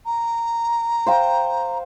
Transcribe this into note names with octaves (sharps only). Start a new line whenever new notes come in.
A#5
C5 F5 G5